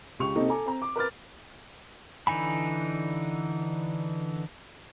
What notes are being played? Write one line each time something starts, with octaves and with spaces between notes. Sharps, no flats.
C#2 G4 C#6 F7
C3 A#3 C4 D#4 A4
A4 G#5 A#5 D6
C4 A#5
D6
A#4 B4 D6 F6 A6
D3 E3 D#4 G#5 B5